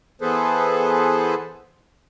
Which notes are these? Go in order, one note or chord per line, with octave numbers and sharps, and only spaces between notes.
E3 B3 G#4 A4 B4 C5